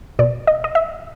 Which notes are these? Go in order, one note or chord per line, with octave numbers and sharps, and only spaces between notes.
B2 D5
D#5
D#5
E5